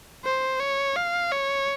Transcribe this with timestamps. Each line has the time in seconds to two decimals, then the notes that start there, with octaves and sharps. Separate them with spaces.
0.24 C5
0.60 C#5
0.96 F5
1.32 C#5